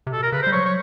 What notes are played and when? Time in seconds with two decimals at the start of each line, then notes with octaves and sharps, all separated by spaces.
0.07 C3
0.13 B2 A4
0.22 A#4
0.32 C#3 B4
0.42 C5
0.47 G3
0.52 F#3 C#5
0.65 C#5